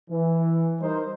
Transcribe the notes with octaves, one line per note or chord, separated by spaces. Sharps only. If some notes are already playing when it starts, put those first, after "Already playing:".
E3
G3 D#4 A#4 C5